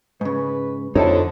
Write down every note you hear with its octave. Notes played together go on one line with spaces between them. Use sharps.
G#2 C#3 B4
F2 D3 D#4 E4 A4 C#5